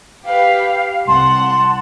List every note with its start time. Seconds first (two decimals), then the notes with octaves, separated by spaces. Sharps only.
0.25 G4 B4 F5
1.07 C2 F#5 A5 C6